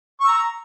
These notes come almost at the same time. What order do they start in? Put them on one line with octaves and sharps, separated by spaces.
C#6 E6 A#5